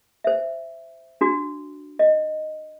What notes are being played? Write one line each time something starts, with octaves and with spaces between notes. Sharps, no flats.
C5 E5
D4 F#4
D#5